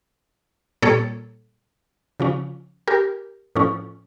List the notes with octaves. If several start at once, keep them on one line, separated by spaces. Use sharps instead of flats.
A#2 G3 A#3 A4 C#5
C#3 F3 C#4
G4 A#4
A2 F3 C#4